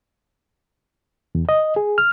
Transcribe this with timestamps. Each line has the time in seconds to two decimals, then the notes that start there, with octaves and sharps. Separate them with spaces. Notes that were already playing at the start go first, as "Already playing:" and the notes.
1.35 E2
1.49 D#5
1.76 G#4
1.98 F6